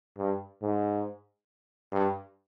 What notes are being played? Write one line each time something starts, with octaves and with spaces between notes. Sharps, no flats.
G2
G#2
G2